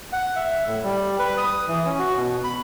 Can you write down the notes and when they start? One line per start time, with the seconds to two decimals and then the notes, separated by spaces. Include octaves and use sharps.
0.13 F#5
0.36 E5
0.66 A2
0.84 G3
1.19 B4
1.37 D#6
1.68 E3
1.86 C#4
1.99 F#4
2.16 B2
2.44 B5